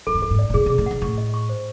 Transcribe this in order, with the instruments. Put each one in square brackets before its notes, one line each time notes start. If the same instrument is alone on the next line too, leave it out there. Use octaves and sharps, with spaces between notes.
[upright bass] G2 [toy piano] A4
[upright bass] G#2
[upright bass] G2 [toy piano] A4
[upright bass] G#2
[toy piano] D5
[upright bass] B2
[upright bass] A#2 [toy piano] G#4
[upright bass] B2 [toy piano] G#4
[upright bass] A2
[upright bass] G#2 [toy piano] F#5
[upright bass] A2 [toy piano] C#6
[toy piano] D#5
C#6
C5